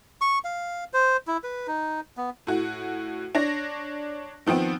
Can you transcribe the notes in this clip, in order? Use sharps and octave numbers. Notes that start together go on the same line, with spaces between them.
C#6
F5
C5
E4
B4
D#4
B3
A2 F#4
D4 C#5 A#6
D#3 F3 B3 C4